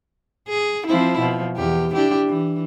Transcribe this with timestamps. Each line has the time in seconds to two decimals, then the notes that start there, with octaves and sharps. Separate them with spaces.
0.49 G#4
0.87 F3 C4 E4
1.19 B2 F3
1.57 E2 G4
1.94 D4 E4 G4
2.28 E3